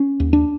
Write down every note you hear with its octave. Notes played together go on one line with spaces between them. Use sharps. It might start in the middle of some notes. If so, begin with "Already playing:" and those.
Already playing: C#4
D#2
D4